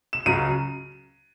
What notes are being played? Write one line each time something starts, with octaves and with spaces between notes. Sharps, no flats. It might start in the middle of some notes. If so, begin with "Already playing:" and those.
E7
C#2 C#3 F#3 D#7